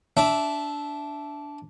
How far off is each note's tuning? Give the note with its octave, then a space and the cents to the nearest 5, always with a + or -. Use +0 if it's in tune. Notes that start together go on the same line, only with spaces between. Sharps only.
D4 -15 E5 +0